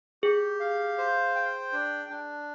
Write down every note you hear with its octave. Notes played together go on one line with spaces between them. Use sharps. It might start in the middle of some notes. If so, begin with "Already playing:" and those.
G4 G#4
F5
C5
G5
D4
D4